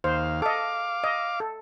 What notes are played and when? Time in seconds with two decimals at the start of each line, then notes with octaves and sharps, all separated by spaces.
0.04 D#2 C5 F5
0.42 A4 D#5 F5 D6
1.04 D#5
1.40 A4